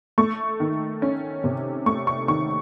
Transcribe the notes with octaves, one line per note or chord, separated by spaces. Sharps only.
A3 C#6
D#3
C#4
C3
A3 C#6
C#6
D#3 C#6